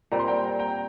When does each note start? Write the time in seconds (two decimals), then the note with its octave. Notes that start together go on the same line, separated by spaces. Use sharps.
0.11 A#2 G3 C4 A#5
0.19 C6
0.28 G5 A#5
0.59 G5 A#5